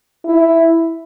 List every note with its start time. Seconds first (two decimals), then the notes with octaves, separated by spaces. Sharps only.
0.25 E4